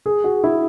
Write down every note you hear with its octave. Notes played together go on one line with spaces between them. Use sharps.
G#4
F#4
E4